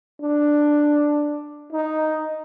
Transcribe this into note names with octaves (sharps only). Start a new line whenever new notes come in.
D4
D#4